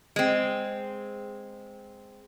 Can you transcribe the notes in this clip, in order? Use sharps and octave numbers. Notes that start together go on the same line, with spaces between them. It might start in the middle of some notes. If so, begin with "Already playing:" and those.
G#3 C4